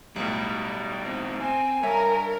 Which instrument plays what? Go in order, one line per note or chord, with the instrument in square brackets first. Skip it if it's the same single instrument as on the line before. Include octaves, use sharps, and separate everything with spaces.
[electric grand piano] B1 A2 [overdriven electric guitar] G3
[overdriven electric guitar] C4 D#4
[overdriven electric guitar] C4 [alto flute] G#5
[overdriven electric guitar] G2 [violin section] A#4 [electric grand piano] C#5 E5